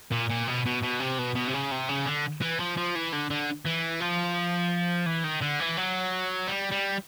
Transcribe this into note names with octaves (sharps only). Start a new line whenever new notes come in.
A#2
A#2
B2
B2
B2
C3
B2
B2
C3
C#3
C3
C#3
D3
E3
F3
F3
E3
D3
D3
E3
F3
E3
D#3
D3
E3
F#3
G3
G3